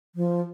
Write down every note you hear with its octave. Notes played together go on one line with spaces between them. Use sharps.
F3